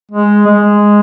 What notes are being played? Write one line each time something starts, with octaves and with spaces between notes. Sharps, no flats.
G#3
G#3